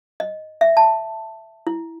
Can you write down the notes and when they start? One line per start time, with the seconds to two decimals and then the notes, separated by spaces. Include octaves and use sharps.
0.20 D#5
0.61 E5
0.77 A5
1.67 E4